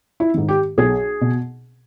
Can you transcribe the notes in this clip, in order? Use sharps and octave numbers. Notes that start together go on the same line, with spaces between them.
E4
G#2 D#3
G4
B1 G#4
B2